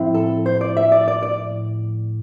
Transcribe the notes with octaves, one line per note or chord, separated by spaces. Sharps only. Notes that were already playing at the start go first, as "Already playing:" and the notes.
Already playing: A2 F3 C4 E4
A4
C5
D5
E5
D5
D5
D5